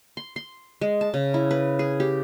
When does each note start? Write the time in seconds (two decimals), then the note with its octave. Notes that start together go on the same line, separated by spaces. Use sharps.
0.17 C6
0.36 C6
0.81 G#3
1.01 A5
1.14 C#3
1.34 E4
1.51 B4
1.79 G#4
2.00 G4